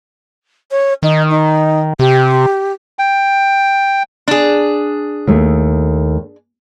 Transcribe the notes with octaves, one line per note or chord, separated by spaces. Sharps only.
C#5
D#3 D#4
D#4
C3 G4
G5
D4 G#4
D#2 A3